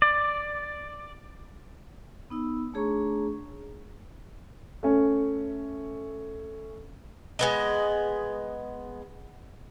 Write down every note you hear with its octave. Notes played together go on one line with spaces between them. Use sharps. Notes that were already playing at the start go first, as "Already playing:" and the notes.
D5
B3 D#4 E6
A3 D4 G#4 C#5 A#5 C#6
A3 C#4
G#3 B3 D#5